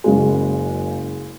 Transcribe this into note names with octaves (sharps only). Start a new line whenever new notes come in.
F#1 C#3 G#3